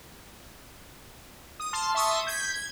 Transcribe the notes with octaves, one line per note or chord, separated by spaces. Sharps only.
D#6
A5 C6 F6
E5 A5 C6 C#6 D#6 E6
G6 G#6 B6
G#6